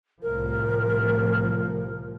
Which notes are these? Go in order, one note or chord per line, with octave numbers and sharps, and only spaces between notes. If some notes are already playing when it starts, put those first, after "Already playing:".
C2 A2 F3 A#4